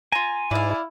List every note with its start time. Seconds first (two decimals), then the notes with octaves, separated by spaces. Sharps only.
0.12 F4 G#5 A#5
0.51 G#2 E4 D5 F5